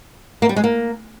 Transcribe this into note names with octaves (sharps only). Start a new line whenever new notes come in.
A#3
G3
G#3
A#3